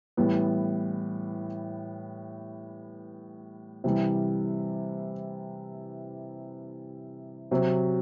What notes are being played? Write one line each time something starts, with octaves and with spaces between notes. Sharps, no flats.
A2 E3 G3 B3
C3 E3 G3
C3 F#3 C4